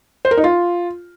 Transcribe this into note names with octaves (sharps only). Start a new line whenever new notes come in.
C5
A#4
D#4
F4